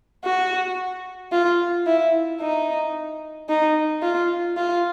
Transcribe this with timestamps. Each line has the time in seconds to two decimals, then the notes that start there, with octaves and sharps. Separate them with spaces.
0.24 F#4
1.32 F4
1.86 E4
2.41 D#4
3.49 D#4
4.03 F4
4.57 F4